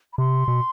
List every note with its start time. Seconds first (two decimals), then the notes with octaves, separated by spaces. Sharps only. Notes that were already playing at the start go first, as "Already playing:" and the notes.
0.13 B5
0.18 C3 C6
0.48 B2